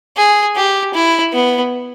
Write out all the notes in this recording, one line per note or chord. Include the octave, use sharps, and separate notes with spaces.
G#4
G4
E4
B3